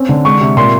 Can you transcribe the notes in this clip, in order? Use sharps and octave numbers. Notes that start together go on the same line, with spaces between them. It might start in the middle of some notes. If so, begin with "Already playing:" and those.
Already playing: C4 C#4
D3
G#3 C#6
C3
A#2 C6